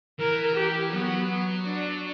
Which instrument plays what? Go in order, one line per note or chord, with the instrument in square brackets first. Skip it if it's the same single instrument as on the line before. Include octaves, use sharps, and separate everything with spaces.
[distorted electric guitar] E3 [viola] A#4
[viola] G4
[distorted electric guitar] F#3 [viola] B3
[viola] D4